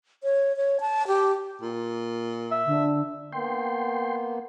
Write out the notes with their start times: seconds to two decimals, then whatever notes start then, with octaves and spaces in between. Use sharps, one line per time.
0.23 C#5
0.57 C#5
0.80 A5
1.08 G4
1.62 A#2
2.51 E5
2.66 D3
3.32 A#3 B3 G5 C6